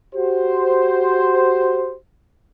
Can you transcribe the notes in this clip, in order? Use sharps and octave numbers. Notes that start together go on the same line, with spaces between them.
F#4 G4 C5